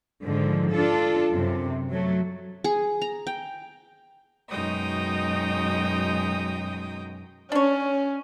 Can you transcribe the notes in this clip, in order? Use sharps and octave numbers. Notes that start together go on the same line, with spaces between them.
G#2 D3 D#3 F3
D4 F4 A4
F#2 C3
F#3 A3
G#4
A#5
G5
F#2 B2 G#3 D#4 G5 D#6
C#4 D4 C#5